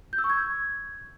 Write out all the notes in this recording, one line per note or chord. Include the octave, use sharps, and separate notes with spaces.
G6
E6
C#6
G#6